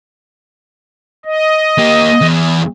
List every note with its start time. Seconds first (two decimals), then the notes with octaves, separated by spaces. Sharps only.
1.25 D#5
1.78 A#3 G4
2.21 E2